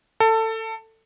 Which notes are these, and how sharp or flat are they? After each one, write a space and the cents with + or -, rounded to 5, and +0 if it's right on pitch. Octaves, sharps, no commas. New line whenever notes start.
A4 +20